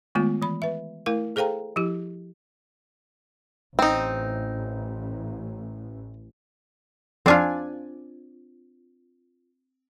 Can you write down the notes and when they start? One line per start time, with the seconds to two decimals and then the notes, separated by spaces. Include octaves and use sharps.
0.15 D#3 G#3 A3 B3 F4
0.42 E3 B5
0.62 B4 E5
1.06 A3 E4 A#4 F5
1.36 G#4 A4 C5 F5 G5 A#5
1.76 F3 E4 G4
3.79 A1 C4 D#4
7.26 F2 C4 D4 F4 D5 G#5